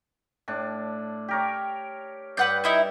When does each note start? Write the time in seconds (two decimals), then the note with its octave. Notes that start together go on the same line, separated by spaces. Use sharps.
0.48 A2 D4
1.28 G4 A#4 C#5
2.37 G2 B4 D5 F#5 G6
2.64 D#4 E4 E5